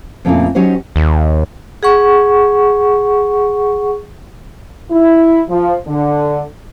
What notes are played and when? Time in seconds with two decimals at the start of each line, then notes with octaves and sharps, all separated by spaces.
0.25 F2 A#2 C#3 A3 A#3 E4
0.55 F#3 C#4 D#4 G4 C5
0.96 D#2
1.83 G#4 F#5 C#6
4.91 E4
5.49 F3
5.87 D3